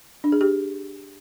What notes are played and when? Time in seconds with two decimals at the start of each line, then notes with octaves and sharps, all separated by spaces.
0.24 D4
0.32 G#4
0.41 G4